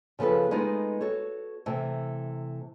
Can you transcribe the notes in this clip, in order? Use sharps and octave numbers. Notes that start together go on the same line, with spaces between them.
C#3 F3 B3 A4 B4
G#3 A3 B3 D#4 F4
F#4 A4 C#5
C3 E3 A3